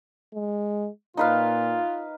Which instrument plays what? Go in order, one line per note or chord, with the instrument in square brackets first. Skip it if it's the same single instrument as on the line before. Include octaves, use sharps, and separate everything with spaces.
[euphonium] G#3
[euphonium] A#2 [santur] D#4 B4 F5 [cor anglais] F4